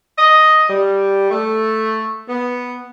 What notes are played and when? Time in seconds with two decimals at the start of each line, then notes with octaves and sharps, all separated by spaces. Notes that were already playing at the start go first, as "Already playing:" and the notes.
0.18 D#5
0.70 G3
1.31 A3
2.29 B3